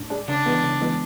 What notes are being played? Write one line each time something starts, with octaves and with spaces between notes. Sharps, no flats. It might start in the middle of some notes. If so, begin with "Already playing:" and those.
Already playing: A2 D4
G#3 D4
C#3 D4
E3 G#3 B3
C#3
E3 G#3 B3